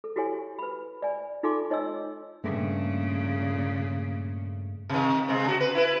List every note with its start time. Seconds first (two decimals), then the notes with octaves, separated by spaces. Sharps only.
0.04 A4
0.16 E4 F#4 G4 A4 C#5 G#5
0.59 B4 B5
1.02 D5 G#5
1.43 D#4 F4 A4 G#5 C6 D6
1.70 D#4 C#5 D#5 G#5 E6
2.44 G2 A#2 C#3 A3 G#4
4.89 C3 D#3
5.28 C3 G#3 C4
5.45 C#3 F#4
5.61 B4
5.75 E4 B4